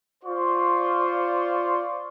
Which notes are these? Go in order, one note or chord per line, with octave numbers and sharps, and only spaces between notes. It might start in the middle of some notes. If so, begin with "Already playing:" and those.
F4 C5 D5 C6 C#6